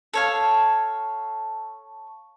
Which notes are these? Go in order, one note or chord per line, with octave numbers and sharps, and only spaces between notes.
A4 C#5 F5